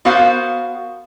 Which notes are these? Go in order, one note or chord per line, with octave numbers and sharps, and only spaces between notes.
B3 F#4 A#4 C5 F5